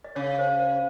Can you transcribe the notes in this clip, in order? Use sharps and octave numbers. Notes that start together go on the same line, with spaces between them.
D#5
C#3 C#5
C5
C5